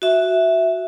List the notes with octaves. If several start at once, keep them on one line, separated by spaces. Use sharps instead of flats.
F#4 E5